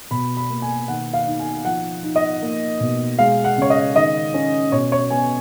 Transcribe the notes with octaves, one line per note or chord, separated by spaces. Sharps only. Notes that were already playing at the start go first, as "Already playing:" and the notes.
B2 B5
B5
A#3
G#5
D#3 F#5
F5
D#4
G#5
F3 F#5
D#4
D#5
A#3
B2
G#3 F5
F#5
C#3 C#5
D#5
D#3 D#5
C#4
B2 C#5
C#5
B3 G#5